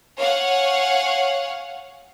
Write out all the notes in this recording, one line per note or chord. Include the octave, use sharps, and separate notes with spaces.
C#5 F5 F#5 G#5